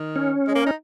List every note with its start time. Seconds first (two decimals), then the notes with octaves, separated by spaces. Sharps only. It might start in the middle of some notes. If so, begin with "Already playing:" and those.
Already playing: D#3
0.16 C#4
0.48 G#3
0.55 A#3
0.66 D#4